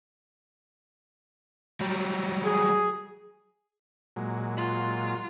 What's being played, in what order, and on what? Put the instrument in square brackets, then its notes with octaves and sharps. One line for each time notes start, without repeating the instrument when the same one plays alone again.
[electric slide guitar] F#3 G3
[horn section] G#4
[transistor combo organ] A#2 F#3 G#3
[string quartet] F4